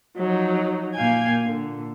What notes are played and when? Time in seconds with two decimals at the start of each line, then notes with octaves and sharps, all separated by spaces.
0.17 F3 F#3 D#4
0.94 A#2 A#3 F5 G5 G#5 G#6
1.45 A#2 D3